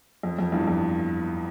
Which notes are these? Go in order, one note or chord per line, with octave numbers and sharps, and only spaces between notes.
F2
F2
E2 G2
F2